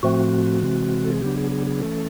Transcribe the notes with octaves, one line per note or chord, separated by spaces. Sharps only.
A2 F3 A3 C4 F#4
C3 E3 G#3 C4
A4
G#4
C#3 F#3 B3 D4 G4
G#4
G#4
G#4
E3 A3 C#4 A4